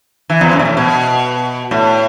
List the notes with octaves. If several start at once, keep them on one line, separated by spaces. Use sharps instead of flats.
E3
E2
F#2
B2
A2
B2
A2